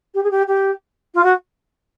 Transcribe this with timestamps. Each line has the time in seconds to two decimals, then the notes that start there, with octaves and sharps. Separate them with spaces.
0.14 G4
0.23 G#4
0.30 G4
0.47 G4
1.14 F4
1.23 F#4